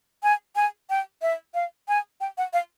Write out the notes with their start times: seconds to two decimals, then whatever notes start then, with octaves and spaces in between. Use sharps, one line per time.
0.23 G#5
0.56 G#5
0.90 G5
1.22 E5
1.54 F5
1.88 G#5
2.21 G5
2.38 F#5
2.53 F5